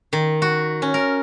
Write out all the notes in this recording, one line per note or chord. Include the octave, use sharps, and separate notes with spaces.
D#3
F#4
C#4
A#4